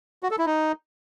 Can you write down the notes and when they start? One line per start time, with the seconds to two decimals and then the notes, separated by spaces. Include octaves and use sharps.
0.23 F#4
0.31 A4
0.39 E4
0.46 D#4